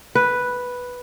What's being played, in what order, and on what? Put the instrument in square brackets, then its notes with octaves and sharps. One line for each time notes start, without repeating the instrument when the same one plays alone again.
[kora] B4